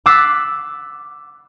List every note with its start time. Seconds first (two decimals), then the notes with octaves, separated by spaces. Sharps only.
0.06 D6 E6 F#6 A6 B6 C7